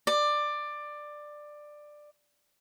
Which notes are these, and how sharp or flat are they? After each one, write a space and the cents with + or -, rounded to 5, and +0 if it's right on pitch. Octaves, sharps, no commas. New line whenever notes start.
D5 +15